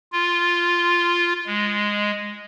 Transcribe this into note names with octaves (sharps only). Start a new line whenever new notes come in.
F4
G#3